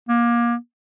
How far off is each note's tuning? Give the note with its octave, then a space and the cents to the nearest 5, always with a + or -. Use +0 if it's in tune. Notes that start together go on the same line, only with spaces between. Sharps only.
A#3 +25